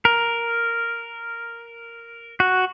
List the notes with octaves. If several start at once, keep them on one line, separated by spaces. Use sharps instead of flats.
A#4
F#4